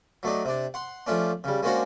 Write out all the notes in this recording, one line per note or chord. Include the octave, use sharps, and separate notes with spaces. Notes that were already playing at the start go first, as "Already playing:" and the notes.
F#3 A3 D4 D#4
C3 D4
F#5 C6
F3 A3 C#4 D4
C#3 G3
G#3 A#3 C#4 D4 F#4 C5